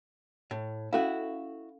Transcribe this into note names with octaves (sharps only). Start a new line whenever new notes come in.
A2
C#4 E4 F#4 A4 F5